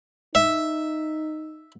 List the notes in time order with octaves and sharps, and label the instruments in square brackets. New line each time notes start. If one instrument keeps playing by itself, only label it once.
[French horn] D#4 [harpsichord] E5